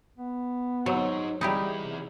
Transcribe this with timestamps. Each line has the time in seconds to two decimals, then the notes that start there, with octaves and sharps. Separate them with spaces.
0.18 B3
0.86 F#3 D#4 F#4 C5 C#5 E6
1.41 E3 G3 D#4 E4 G4 G#4
1.82 C3